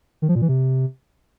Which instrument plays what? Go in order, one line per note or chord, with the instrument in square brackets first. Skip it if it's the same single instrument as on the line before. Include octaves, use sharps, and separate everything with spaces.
[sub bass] D#3
F3
A#2
E3
C3